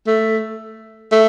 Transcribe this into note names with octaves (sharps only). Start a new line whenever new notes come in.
A3
A3